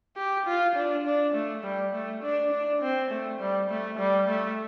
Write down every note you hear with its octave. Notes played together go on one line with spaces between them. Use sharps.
G4
F4
D4
D4
A3
G3
A3
D4
D4
C4
A3
G3
A3
G3
A3